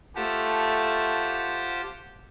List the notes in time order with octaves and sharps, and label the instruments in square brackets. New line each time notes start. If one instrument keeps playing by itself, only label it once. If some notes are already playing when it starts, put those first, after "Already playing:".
[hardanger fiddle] A3 [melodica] F4 F#5 A5 [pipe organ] G4 C5